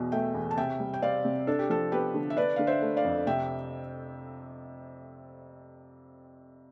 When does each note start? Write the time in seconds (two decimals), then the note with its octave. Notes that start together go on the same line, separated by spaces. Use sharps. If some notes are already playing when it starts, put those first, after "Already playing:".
Already playing: E2 B2
0.12 A3 E5 G5
0.35 E2
0.51 A5
0.57 C3 E5 G5
0.80 G3
0.94 G5
1.02 C4 D5 F5
1.25 C3
1.47 D4 A4
1.59 G4
1.69 F3 A4
1.92 B3 G4 B4
2.14 D3
2.30 E5
2.37 D4 B4 D5
2.56 D3 F5
2.67 C5 E5
2.82 A3
2.97 D5 F5
3.05 F2
3.27 C3 E5 G5